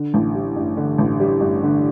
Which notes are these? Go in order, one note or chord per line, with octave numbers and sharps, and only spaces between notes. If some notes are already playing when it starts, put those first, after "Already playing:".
Already playing: D3
A1
G3
G2
D3
A1
G3
G2
D3